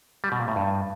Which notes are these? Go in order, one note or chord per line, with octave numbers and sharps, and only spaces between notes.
G3
B2
A#2
A2
G2